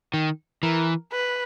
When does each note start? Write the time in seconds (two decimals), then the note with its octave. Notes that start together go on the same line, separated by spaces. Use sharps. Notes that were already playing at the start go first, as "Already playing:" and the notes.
0.14 D#3
0.63 E3 A#4
1.13 B4